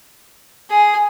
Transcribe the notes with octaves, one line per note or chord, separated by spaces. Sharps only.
G#4